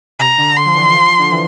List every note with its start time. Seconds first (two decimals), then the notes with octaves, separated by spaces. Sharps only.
0.19 C3 A#5
0.38 D3
0.56 D3 C6
0.66 F3
0.75 E3
0.93 F3
1.19 D3
1.30 E3